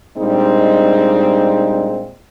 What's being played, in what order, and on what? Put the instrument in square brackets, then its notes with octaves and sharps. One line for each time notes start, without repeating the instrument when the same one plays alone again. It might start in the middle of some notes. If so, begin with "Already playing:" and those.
[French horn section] A#2 G3 G#3 C4 D4 D#4